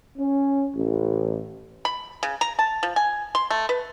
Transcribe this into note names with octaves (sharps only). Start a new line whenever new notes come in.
C#4
A1
B5
C#3
A#5
A5
F3
G#5
C6
A3
B4